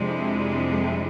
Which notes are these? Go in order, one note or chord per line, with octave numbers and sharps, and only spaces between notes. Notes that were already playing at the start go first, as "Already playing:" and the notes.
Already playing: F2 C3 G#3 D4
E4
D4
D4
D4
C4